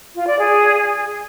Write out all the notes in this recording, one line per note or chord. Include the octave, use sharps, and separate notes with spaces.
F4
D5
G#4